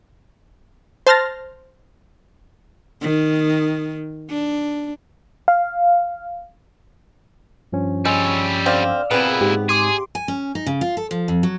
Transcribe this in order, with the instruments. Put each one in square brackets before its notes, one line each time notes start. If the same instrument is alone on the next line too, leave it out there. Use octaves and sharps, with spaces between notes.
[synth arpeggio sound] C5 A5 C6 F6 A6 A#6
[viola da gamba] D#3
D4
[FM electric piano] F5
[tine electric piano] G2 F3 C#4
[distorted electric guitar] G3 C#5 [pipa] G#3 [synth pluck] E6
[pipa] D3 C4 [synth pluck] D5 F5 F6
[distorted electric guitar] A#2 E4 [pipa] G3 B3 [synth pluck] C4 G#4
[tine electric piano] G#2 [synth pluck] G4
[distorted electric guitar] G#4 [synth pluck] C6 D6
[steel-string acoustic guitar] G#5
C#4
D#4
C#3
F4
A4
F3
F2
F#3